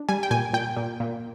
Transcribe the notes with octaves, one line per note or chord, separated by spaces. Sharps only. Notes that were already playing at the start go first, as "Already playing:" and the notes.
Already playing: D4
G3 G#5
G5
A#2 G#5
A#2 G5
A#2
A#2